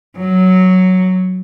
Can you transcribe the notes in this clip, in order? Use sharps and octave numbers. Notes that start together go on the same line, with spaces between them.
F#3